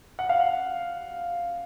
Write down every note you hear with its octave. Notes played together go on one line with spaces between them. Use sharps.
F#5
F5
F#5